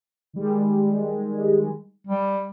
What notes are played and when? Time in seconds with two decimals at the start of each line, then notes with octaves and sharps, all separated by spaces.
0.33 D#3 G3 G#3
2.07 G3